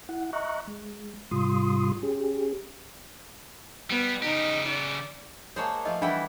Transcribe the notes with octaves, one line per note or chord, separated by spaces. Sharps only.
E4 F#5
D#5 E5 A#5 C#6 F#6
G#3
G#2 C3 G3 F4 C6 D#6
C#4 G4 G#4
G3 B3
C#3 D#4 G4
D5
G#3 A#3 C5 C#5 A5
F3 A3 D#5 F5
E3 G3 D4 E4 B4 F#5 G5